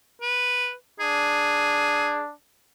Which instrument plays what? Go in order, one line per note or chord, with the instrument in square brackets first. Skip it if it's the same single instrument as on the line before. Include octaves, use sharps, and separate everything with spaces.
[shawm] B4
[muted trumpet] D4 [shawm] G#4